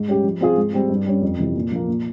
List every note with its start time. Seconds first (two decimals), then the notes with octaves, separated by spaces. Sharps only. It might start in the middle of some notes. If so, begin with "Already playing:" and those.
Already playing: G#2
0.08 G3 C#4 G4
0.24 F3
0.41 C4 F4 G#4
0.56 G#2
0.73 G3 C4
0.90 G2
1.06 G3 C#4
1.22 F2
1.39 C3 E3
1.56 A#2
1.72 F3 A#3
1.88 A#2